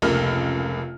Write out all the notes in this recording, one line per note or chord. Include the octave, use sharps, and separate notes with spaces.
F1 C#2 A#3 F6